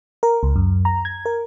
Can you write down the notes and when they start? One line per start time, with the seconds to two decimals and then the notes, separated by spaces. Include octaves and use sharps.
0.23 A#4
0.43 C#2
0.56 F#2
0.85 A#5
1.05 G#6
1.26 A#4